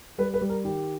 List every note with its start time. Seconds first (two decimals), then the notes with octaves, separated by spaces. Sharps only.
0.18 G3 B4
0.34 B4
0.41 G3
0.50 A#4
0.64 D#3 G4